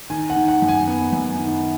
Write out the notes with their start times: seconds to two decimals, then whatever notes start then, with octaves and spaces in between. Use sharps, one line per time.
0.10 D#3 G#5
0.30 F#5
0.36 D#3
0.48 F#5
0.62 F#2 F#5
0.69 G#5
0.87 B3
1.13 F#2
1.38 D#3